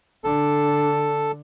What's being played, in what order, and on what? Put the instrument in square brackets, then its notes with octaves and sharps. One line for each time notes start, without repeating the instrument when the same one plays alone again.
[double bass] D3 D4 [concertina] A4